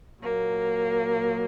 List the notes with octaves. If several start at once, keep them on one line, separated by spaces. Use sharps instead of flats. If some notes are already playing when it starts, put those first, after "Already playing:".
A#2 F#3 A#3